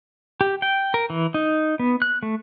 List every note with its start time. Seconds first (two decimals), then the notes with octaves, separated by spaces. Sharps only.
0.41 G4
0.62 G5
0.94 A#4
1.10 E3
1.34 D#4
1.79 B3
2.02 F#6
2.23 A3